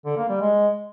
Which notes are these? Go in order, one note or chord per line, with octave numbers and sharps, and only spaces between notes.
D3
A#3
G3
G#3